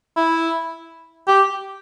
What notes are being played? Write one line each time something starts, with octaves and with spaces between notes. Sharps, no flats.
E4
G4